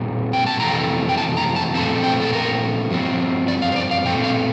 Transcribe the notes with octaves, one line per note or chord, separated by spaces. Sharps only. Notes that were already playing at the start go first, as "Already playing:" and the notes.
Already playing: A#2 G3 C4
G5
A5
F2 C3 E3 A3 A#5
G5
A5
A#5
A5
A#2 F3 A3 C4 A5
G5
A4
A#4
G2 F3 C4
D5
F5
C5
D5
F5
A#2 A3 C4 G5
F5